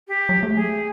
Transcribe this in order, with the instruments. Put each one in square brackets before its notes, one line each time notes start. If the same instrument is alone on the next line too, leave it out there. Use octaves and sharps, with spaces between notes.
[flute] G4
[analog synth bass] F#3
A3
[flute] G#4